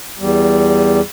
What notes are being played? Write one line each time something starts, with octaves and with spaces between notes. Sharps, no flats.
E2 G3